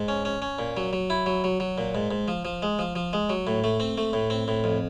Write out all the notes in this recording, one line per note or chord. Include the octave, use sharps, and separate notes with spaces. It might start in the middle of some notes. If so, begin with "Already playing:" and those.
Already playing: G#2
C#4
C#4
C#4
A#2
F#3
F#3
E4
F#3
F#3
F#3
A#2
G#2
G#2
F3
F3
G#3
F3
F3
G#3
F#3
A2
A3
C4
A3
A2
C4
A2
F2